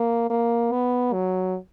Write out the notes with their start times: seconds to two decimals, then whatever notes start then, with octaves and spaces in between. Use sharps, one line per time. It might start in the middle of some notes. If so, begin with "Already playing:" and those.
Already playing: A#3
0.30 A#3
0.72 B3
1.13 F#3